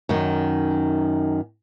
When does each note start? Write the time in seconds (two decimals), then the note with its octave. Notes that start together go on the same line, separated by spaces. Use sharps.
0.09 F#2 D#3